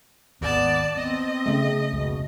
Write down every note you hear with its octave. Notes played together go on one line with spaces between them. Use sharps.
G#1 D#2 B3 D5 A5
B3 C4 D#5
C#3 A3
F1 C#2 B2